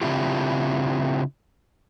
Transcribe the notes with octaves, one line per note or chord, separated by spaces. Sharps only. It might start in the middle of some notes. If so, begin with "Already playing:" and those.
C#3 C4 D4 E4 F4 G4